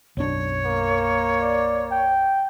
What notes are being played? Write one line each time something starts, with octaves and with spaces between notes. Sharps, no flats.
B1 F#2 D4 C#5
A#3
D5
G5